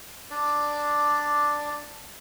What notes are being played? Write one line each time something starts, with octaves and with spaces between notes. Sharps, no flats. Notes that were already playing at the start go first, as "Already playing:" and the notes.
D4 D5